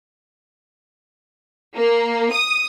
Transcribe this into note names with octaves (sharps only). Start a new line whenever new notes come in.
A#3
D#6